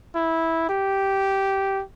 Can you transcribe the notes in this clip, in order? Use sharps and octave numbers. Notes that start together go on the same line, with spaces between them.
E4
G4